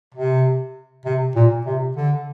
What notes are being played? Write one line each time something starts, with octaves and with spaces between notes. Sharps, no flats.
C3
C3
A#2
C3
D3